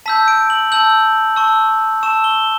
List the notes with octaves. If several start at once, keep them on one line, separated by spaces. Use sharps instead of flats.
A5 E6 G6 B6
D7
F#7
A5 E6 G6 F#7
A5 C#6 E6
A5 C#6 E6 E7
G7